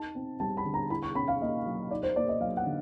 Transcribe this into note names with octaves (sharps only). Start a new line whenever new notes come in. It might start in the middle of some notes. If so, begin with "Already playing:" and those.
Already playing: D#4 A5
C4
G3 A5
B5
D3
A#5
E4 B5
C#6
C#4 B5
F5
A#3 D#5
F#3
D#4 D5
C5
A#3 D5
D#5
F#3 F5
F#5
D3